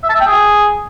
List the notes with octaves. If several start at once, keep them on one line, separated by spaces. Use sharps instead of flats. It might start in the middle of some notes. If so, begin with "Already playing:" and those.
E5
A5
E5
G5
G#4